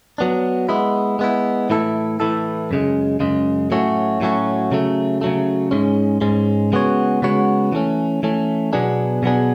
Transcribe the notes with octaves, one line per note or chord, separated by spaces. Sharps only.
F#3 B3 D4
G#3 B3 E4
G#3 B3 E4
A2 E3 A3 E4 A4
A2 E3 A3 E4 A4
F#2 C#3 G#3
F#2 C#3 G#3
A2 F#3 A3 C#4 F#4
A2 F#3 A3 C#4 F#4
C#3 F#3 A3
C#3 F#3 A3
G#2 G#3 C#4
G#2 G#3 C#4
C#3 G#3 B3 F#4 C#5
C#3 G#3 B3 F#4 C#5
E3 A3 C#4
E3 A3 C#4
B2 F#3 B3 D4 G#4
B2 F#3 B3 D4 G#4